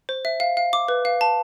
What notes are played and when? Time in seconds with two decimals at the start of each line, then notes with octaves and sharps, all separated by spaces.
0.09 C5
0.25 E5
0.40 F5
0.57 F5
0.73 D6
0.88 B4
1.05 F5
1.21 A5